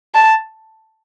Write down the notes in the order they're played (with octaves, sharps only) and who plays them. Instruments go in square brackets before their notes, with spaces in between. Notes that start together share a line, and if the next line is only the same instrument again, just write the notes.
[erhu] A5